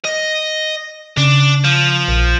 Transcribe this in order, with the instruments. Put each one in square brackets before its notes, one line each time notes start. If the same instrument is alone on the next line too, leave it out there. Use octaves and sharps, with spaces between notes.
[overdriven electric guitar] D#5
[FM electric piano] C#3 [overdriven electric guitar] D4
[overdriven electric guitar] F3
[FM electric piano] A#1